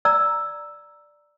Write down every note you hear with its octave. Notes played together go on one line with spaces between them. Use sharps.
D5 A#5 E6